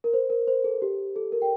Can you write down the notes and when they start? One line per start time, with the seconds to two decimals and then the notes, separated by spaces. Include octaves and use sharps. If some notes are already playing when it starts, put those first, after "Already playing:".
0.04 A#4
0.13 C5
0.30 A#4
0.48 C5
0.64 A4
0.82 G4
1.16 A4
1.32 A#4
1.42 G5